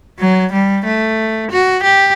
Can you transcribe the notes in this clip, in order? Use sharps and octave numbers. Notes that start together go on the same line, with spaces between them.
F#3
G3
A3
F#4
G4